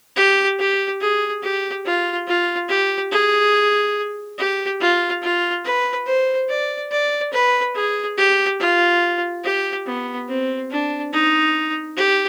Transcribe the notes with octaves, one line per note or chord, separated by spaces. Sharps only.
G4
G4
G#4
G4
F4
F4
G4
G#4
G4
F4
F4
B4
C5
D5
D5
B4
G#4
G4
F4
G4
B3
C4
D4
D#4
G4